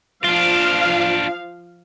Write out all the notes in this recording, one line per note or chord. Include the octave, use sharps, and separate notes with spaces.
F3 D4 F4 F5